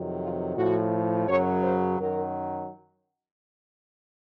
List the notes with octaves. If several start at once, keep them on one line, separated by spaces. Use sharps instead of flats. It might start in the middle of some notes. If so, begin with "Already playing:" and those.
Already playing: F2 C3 D#3 F#3
F4
A2 F3 F#4
F#2 C#3 F#3 C#5
C5
F#2 D#3 F#3 A#4